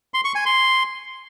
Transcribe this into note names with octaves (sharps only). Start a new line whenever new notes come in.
C6
C#6
G#5
C6